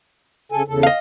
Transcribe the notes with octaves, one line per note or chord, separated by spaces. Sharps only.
C#3 A4 G#5
E2 C#3 A4
D#5 F5